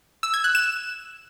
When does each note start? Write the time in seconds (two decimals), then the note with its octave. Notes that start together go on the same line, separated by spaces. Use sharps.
0.23 E6
0.34 G#6
0.44 F#6
0.55 E7